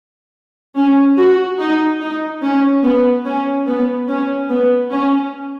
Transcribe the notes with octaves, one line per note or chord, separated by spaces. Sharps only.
C#4
F#4
D#4
D#4
C#4
B3
C#4
B3
C#4
B3
C#4